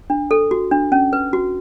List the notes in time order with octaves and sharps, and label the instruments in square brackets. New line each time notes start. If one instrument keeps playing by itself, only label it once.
[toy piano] D4
A4
F#4
D4
C#4
B4
F#4